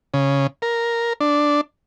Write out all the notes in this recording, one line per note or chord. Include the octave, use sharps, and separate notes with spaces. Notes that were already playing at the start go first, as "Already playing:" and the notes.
C#3
A#4
D4